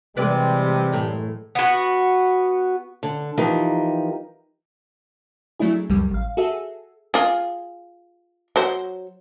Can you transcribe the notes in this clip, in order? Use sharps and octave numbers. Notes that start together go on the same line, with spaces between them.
C3 E3 G3 G#3 B4 D5
F#2 A2
B3 F#4
D3
E3 F3 D#4 G4 A#4
F#3 A3 D4 E4 G#4
C#2 F#2 G3
A1 F5
F#4 G#4 A4 E5
F4 G#4
F#3 C5